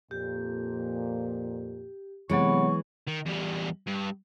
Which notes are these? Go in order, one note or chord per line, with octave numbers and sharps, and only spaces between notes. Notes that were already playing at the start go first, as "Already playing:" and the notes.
F2 A#2 G4
C3 E3 F#3 G#3 B3 C#5 C#6
D#3
E2 G3
G2